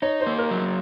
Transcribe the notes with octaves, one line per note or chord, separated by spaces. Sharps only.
D#4 C#5
C5
A#3
A#4
F#3